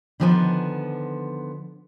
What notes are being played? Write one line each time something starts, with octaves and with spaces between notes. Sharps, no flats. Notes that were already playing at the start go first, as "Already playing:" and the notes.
D3 D#3 F3 B3 G5 G#5